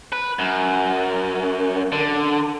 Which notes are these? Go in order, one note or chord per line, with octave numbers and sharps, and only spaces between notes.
B4
F#2
D3